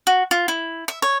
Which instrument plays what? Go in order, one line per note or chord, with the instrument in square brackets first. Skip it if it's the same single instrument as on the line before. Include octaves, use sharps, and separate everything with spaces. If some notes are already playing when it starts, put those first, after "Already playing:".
[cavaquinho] F#4
F4
E4
E5
C#5